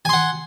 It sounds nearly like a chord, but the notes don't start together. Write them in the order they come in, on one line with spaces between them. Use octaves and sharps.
G#5 C6 F#5